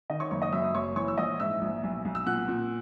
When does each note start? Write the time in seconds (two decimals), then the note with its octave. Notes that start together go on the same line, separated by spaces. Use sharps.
0.10 D#3 D#5
0.20 C#5 C#6
0.31 F#1 C#5 C#6
0.42 D#5 D#6
0.53 F#2 E5 E6
0.64 D#6
0.75 F#1 C#5 C#6
0.96 E3 C#5 C#6
1.08 E6
1.18 A#1 D#5 D#6
1.40 G#2 E5 E6
1.62 A#1
1.83 B1
2.05 B1
2.15 E6
2.26 A#2 F#5 F#6
2.48 A#2